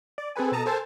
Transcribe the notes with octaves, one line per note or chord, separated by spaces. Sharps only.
D5
C4 G#4 A4 B4 G#5
B2 A4 A5 A#5 D#6
A4 A#4 C5 G#5 A5